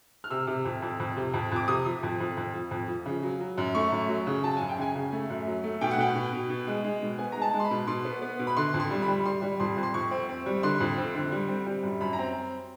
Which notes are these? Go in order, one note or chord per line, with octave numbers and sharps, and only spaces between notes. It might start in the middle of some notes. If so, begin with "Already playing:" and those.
F6
C3 E6
C3
F2
F2
F2
C3
F2
F2 D6
C3 D#6
F3
F2
F2
F2
F3
F2
F3
C#3
F#3
F#3
F#2
A3 C#6
F#2
F#3
C#3
F#3 A5
F#2 G#5
G5
C#3 G#5
C#3
A3
F#2
F#3
A3
B2 G5
F#5
B2 G5
B2
B2
B2
G#3
G#3
B2
B3 G#5
G#3 A#5
A5
G#3
C6
B5
B2
B2 C6
B3
B3
B2
B5
D3 C6
F2
C6
G3
B5
G3
G3 C6
G3
F2 C6
F2
C6
F2 C#6
C4
C4
G3
D3 C6
F2
C4
D3
G3
C4
G3
F#2
F#2 B5
A#5
C4